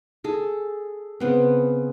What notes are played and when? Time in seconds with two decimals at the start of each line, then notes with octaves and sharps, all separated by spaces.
0.24 G#4 A4
1.20 C#3 B3 C4